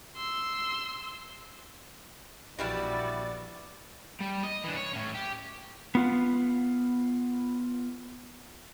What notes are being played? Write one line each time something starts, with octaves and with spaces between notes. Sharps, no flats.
C6 E6
A#1 E3 G3 E4 F#4 D5 A6
G3
D#5
E3 D4
C#5
A2 C#4
G4
B3 F4 F#5